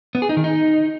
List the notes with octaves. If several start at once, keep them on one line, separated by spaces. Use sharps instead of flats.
B3
G#4
D#4
D#3
D#4